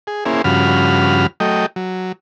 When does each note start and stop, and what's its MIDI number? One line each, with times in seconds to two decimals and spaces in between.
0.07 0.25 68
0.25 0.42 58
0.25 0.42 61
0.25 0.42 64
0.25 0.42 68
0.25 0.42 72
0.44 1.27 43
0.44 1.27 49
0.44 1.27 53
0.44 1.27 66
0.44 1.27 83
0.44 1.27 89
1.40 1.66 54
1.40 1.66 57
1.40 1.66 75
1.40 1.66 79
1.76 2.12 54